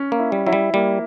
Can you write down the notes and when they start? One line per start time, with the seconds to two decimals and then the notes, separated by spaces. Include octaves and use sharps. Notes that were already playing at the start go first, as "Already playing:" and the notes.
Already playing: C#4
0.12 A#3
0.19 E4
0.32 G3
0.47 F#3 E4
0.53 G3
0.74 G3 A#3